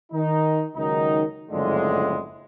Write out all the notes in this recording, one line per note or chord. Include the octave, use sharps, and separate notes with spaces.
D#3 D#4
C#2 D#3 F#3 D#4
F#1 F2 A2 D3 G#3